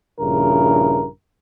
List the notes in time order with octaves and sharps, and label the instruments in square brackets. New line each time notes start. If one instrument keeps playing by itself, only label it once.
[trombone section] A#1 G2 C#3 E4 A#4